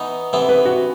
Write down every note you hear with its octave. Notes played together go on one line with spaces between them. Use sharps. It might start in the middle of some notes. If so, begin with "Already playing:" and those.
Already playing: E3 B3 D#4
C3 E3 B3 E4
B4
F#4